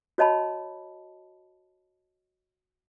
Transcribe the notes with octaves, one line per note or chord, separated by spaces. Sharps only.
F#4 C#5 D#5 A5 B5